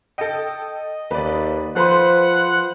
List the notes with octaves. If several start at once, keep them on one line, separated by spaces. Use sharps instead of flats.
A4 D#5 G5
D#2 B4 D5
F3 A4 B4 C5 F#5 C6